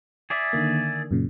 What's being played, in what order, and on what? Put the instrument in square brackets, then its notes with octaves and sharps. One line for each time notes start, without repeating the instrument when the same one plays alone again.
[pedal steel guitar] G#4 D5 E5
[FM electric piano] D3 D#3 A#3
F#2 A#2 C#3